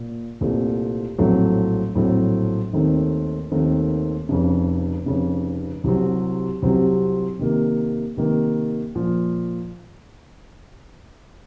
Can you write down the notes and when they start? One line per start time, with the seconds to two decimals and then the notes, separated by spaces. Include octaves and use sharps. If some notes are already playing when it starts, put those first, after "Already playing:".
Already playing: A#2
0.41 C2 A#2 A3 C4
1.18 A#1 A2 F#3 A3 C4
1.95 A#1 A2 F#3 A3 C4
2.73 D#2 D#3 A3 C4
3.52 D#2 D#3 A3 C4
4.29 F1 F2 C#3
5.06 F1 F2 C#3
5.84 C2 C3 F#3 C4
6.62 C2 C3 F#3 C4
7.39 C3 D#3 A#3
8.17 C3 D#3 A#3
8.95 A#2 F3